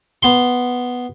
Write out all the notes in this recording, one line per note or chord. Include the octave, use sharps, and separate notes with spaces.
B3 C6